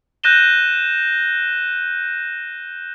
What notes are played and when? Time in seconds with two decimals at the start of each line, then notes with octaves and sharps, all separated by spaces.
0.24 F#6 G6 A#6 D#7 E7 G7